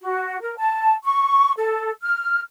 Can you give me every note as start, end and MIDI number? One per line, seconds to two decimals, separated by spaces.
0.01 0.38 66
0.41 0.54 70
0.57 0.94 81
1.04 1.52 85
1.57 1.91 69
2.02 2.41 89